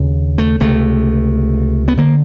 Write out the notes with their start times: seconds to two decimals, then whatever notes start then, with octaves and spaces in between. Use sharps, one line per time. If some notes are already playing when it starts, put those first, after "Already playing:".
Already playing: D#2 C#3
0.38 A3
0.60 C#2 C3 A3
1.88 B3
1.97 D3 A#3